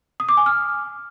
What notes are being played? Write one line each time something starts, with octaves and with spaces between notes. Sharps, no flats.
D#6
D6
G#5
F6